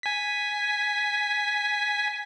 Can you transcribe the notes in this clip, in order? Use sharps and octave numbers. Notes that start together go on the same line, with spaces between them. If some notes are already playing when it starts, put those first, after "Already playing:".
G#5 B6